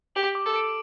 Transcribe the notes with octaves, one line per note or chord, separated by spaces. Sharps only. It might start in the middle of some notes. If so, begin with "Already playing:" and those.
G4 F#7
D6
A4
D7